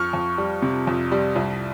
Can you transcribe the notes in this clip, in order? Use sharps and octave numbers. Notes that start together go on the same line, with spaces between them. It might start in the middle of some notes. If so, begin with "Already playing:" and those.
Already playing: F2 C#6 F6
F2
G3
C3
F2
G3
C2